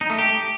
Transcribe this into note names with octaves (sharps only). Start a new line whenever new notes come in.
D#4
A3
G4